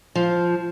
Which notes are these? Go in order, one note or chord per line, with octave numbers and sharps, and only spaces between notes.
F3